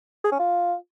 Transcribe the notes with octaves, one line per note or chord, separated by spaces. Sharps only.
G#4
C#4
F4